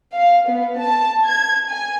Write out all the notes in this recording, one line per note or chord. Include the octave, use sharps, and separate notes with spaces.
F5
B3
A5
G#6
G#5